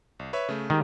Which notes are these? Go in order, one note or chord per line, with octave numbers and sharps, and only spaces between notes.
C2
B4 C#5 E5
C#3 A3
D#3 G#3 G4